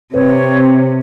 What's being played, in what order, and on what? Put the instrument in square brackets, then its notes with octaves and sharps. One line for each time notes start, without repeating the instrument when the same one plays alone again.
[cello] C3 [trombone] C4 [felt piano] B4 [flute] C#5